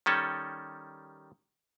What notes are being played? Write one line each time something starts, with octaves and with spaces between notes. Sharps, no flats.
D#3 G3 C#4 A4